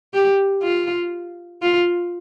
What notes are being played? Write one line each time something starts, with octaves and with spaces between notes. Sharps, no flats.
G4
F4
F4